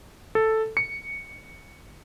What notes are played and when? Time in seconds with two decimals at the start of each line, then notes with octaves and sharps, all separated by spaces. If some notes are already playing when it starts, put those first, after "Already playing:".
0.35 A4
0.77 C#7